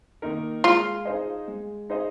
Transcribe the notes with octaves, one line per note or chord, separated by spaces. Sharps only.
D#3 A#3 D#4 A#4
G#3 F4
D#4 G#4 C5 D#5
G#3
D#4 G#4 C5 D#5